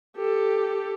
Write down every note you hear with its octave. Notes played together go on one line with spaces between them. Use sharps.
G4 A4